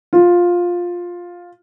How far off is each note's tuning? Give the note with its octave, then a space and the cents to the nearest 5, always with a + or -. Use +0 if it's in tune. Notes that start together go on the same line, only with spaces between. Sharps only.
F4 +10